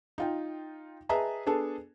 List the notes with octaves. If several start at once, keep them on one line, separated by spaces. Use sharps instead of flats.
D#4 F4 G5
G#4 B4 D#5 E5 A5 A#5
B3 D4 G#4 A4